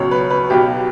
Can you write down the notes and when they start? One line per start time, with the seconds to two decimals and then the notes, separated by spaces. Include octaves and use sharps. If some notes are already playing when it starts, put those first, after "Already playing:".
Already playing: C#2 B2 F#3 C#5
0.11 B4
0.30 B4
0.50 B1 B2 F#3 G4